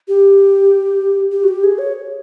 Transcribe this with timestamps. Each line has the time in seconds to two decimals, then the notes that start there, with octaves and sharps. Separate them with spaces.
0.08 G4
1.32 G4
1.44 F#4
1.48 G4
1.64 G#4
1.79 C#5